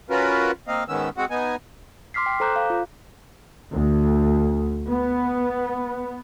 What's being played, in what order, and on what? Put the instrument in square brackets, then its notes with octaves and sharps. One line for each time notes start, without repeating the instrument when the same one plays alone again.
[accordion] C#4 F4 F#4 A#4 B4
A#3 C4 D#5 F5
G#2 D#3 B3 C#4 E6
G#3 C4 F#4 F#5
B3 D#4 G#5
[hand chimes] C6 D6 F6 B6 C7
G5
A4 C5 A#5 D6 F#6 G6
F5
F4
[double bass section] D2
B3